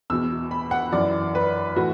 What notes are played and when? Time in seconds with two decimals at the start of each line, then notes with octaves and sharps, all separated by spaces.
0.10 E2 B2 E6
0.51 B5
0.71 F#5
0.92 F#2 E3 D5
1.35 B4
1.76 A2 E3 F#4